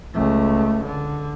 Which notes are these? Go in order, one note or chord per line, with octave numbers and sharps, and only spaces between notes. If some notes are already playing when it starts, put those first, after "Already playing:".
C#2 A3
D3